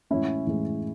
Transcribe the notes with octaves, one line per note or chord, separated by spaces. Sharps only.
A2 E3 G#3 C#4 E4
A2 E3 G#3